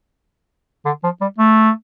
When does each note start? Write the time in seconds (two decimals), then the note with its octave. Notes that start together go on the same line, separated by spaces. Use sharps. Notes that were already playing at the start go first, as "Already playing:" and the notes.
0.85 D3
1.03 F3
1.21 G3
1.38 A3